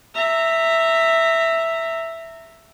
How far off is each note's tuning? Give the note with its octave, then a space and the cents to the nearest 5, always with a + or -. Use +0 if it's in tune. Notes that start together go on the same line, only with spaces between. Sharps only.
E5 +0 A#5 -20